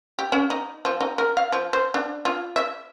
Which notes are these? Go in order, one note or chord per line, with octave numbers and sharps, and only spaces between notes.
G4
C#4
D#4
F3
D#4
A#4
F5
F3
C5
D4
F4
E5